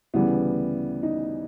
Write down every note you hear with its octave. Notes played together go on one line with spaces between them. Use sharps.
D2 C#3 E3 G3 B3
D#4